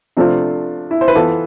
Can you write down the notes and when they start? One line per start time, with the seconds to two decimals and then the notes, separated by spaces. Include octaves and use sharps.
0.17 C3 F3 A3 C4 D4 F4
0.91 E4
1.01 C5
1.08 B4
1.15 E3 B3 F4 A4